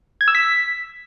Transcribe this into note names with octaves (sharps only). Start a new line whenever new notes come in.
G#6
E6
B6